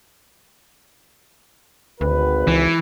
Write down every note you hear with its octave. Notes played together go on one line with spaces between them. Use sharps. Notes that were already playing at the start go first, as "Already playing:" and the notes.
G#1 D2 B4
C#2 E3